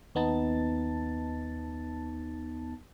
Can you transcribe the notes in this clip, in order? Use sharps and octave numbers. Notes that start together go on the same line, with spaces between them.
D#2 B3 D#4 A5 A6